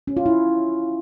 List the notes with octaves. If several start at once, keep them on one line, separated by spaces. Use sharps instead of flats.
C#4
F4
E4